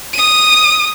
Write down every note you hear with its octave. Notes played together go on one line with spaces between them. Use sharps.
D#6 D#7